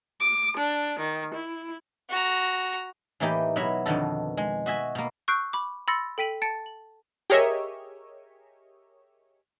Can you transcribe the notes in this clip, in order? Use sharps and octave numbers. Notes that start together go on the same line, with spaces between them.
D6
D4
D#3
E4
F#4 A#5
A2 E3 A#3 D#4 G4
B2 F#3 E4 E5
F2 B2 D3 D#3 A4
G#3
F#4 D#5 E5 G#5
B2 A#3
C#6 E6 F#6 G6 C7 D7
B5 D6
B5 C6 E6 A6 A#6 C#7
A4 G5 B6 D#7 F#7
A5 A6 C#7 D7
F#7
G4 G#4 A#4 C#5 D#5 E5